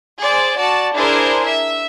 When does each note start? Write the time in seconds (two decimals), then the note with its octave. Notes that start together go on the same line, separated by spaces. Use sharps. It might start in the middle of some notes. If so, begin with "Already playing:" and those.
0.20 G#4 C5 D5
0.58 F#4 D5 A5
0.94 D4 E4 G#4 A#4 C5
1.45 E5